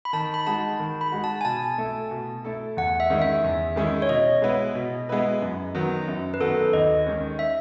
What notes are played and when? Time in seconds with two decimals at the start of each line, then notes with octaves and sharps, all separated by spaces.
0.05 B5
0.13 D#3 A5
0.34 B5
0.46 G#3 D#4 F#4 A5
0.80 D#3
1.01 B5
1.12 G#3 D#4 F#4
1.24 A5
1.41 G#5
1.45 B2 A5
1.78 A3 E4 A4
2.11 B2
2.45 A3 E4 A4
2.77 E2 F#5
3.00 E5
3.10 D#3 G#3 C#4 E4
3.22 E5
3.44 E2
3.76 D#3 G#3 C#4 E4
4.02 C#5
4.09 B2 D#5
4.42 G#3 B3 E4 B4
4.75 B2
5.09 G#3 B3 E4 B4
5.42 F#2
5.75 D#3 F#3 B3
6.08 F#2
6.34 B4
6.40 D#3 F#3 B3 A4
6.73 D#2 D#5
7.06 D#3 G#3 C#4
7.39 E5